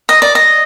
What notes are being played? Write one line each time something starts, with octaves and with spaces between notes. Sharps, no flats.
D#5
D5
D#5